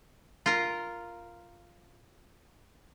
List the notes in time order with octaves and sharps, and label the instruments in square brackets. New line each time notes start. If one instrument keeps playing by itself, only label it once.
[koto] F4 A#4